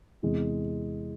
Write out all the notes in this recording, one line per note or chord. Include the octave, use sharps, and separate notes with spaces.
E2 C3 E3 G#3